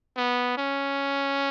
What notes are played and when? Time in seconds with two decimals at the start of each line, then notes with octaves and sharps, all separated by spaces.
0.17 B3
0.57 C#4